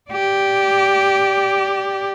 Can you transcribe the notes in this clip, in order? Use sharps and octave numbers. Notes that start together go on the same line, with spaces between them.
G4 D5